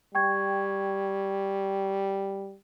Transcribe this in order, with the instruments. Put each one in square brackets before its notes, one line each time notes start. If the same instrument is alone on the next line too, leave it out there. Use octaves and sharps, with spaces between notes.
[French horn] G3 [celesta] G5 C#6 G#6